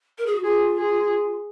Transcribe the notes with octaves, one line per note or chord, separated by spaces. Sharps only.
A#4
G#4
F#4
F4 G#4
G#4